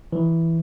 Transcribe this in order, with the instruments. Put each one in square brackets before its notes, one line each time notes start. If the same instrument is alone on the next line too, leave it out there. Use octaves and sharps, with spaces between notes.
[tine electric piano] E3